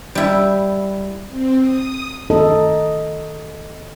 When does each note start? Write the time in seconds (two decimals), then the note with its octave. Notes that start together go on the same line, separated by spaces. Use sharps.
0.15 G3 E4
1.28 C4
1.60 D#6
2.30 D#4 A4 D#5